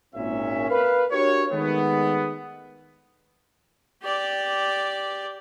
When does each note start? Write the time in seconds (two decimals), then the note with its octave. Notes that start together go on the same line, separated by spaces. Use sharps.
0.15 G#1 A#2 C#4 E5
0.70 A#4 B4 F5
1.11 D4 F#4 G4 A#4 C#5
1.52 D#3 G#3 A3 B3
4.03 G4 D5